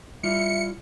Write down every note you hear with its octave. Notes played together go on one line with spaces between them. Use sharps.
G3 E4 F4 E5 C#7